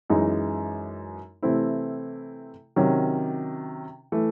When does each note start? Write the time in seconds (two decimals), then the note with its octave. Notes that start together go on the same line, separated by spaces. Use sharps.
0.10 F#2 E3 G#3 D#4
1.43 C3 E3 A3 C4 E4
2.76 C3 D#3 F#3 C#4
4.12 E3 A3